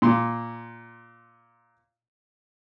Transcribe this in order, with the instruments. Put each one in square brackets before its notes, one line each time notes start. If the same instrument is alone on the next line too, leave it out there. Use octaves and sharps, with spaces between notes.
[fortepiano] A#2 C6